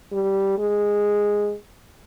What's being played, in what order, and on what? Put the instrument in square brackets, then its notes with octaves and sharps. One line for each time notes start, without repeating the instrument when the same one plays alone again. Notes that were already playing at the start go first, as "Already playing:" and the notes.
[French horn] G3
G#3